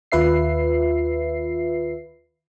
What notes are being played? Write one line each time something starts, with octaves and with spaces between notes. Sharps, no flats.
D#2 F4 B4 E5 C7